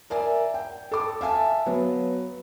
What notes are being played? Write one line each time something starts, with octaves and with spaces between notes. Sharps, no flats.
A#4 D5 E5 G#5
G5
A4 D6
E5 F5 G#5 A5
F#3 B3